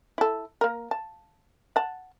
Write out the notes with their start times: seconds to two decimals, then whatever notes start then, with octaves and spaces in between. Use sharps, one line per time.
0.18 E4 A4
0.61 A#3 A#4
0.91 A5
1.76 F#5 A5